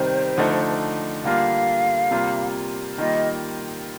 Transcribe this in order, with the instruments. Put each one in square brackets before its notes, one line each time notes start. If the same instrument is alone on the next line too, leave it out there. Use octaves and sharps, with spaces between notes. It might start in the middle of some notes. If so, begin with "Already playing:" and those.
Already playing: [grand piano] C3 D#3 G3 [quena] C5
[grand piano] D3 F3 A3 D#4
[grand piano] D3 G3 A#3 F4 [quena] F5
[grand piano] C3 G3 A#3 F4
[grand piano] D#3 G3 A#3 F4 [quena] D#5